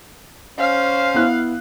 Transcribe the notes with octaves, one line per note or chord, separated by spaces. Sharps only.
C#4 C5 F5
B3 E4 F#6